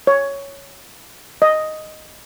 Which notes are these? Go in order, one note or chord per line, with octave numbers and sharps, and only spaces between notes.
C#5
D#5